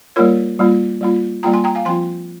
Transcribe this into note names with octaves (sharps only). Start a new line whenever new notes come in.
G3 A#3 F4 A#4 C#5
G3 A#3 F4
G3 A#3 F4
G3 A#3 F4 G5 A#5
G#5 C6
G5 A#5
F5 G#5
F3 C4 F4 G#5 C6